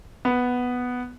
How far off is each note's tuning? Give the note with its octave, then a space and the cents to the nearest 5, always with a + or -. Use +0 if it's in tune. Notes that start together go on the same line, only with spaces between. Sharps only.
B3 +0